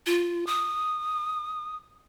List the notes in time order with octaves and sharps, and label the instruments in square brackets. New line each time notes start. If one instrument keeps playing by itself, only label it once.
[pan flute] F4
D#6